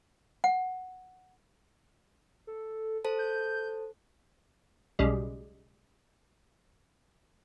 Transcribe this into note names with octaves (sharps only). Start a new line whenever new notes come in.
F#5
A4
A4 C5 A5
G6
B1 C#3 G3 G#3